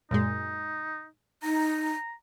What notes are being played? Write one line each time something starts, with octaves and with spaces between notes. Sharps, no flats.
F#2 A#2 G#3 D#4
D#4 A#5